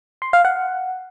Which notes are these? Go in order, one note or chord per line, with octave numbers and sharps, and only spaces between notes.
C6
F5
F#5